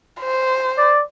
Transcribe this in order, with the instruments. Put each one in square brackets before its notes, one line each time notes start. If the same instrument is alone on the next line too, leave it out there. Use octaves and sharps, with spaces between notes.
[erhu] C5
[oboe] D5